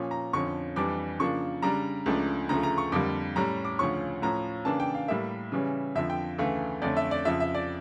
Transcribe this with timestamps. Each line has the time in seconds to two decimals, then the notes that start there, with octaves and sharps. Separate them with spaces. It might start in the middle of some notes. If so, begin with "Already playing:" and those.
Already playing: A#2 F3 C#4
0.11 A#5
0.33 F2 D3 F3 C#4 C#6
0.76 F2 E3 G3 D4 D6
1.19 C#3 F3 A#3 D4 C#6
1.62 C#3 G3 D4 A#5
2.06 C#2 C#3 F3 A3 D4
2.49 D2 C#3 F3 A3 A#5
2.63 A#5
2.78 C#6
2.92 F2 D3 G3 A#3 D6
3.36 A2 G3 C#4 A#5
3.65 D6
3.79 D2 C#3 F3 C#4 C#6
4.22 A2 F3 C#4 A#5
4.65 C#3 E3 A#3 D4 A5
4.80 G5
4.95 F5
5.08 A2 G3 A#3 E5
5.52 C#3 E3 G3 C#4
5.95 F2 D3 F3 E5
6.10 G5
6.38 D2 C#3 E3 A3 F5
6.82 F2 D3 A3 C#4 D5
6.97 E5
7.11 D5
7.25 F2 C#3 F3 E5
7.40 E5
7.55 D5